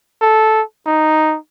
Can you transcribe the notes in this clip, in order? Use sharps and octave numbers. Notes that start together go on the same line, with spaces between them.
A4
D#4